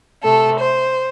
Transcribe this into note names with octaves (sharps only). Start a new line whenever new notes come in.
C3 A3 A4
C5